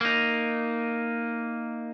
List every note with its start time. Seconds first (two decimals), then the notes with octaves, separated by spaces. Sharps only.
0.01 A#3 D#4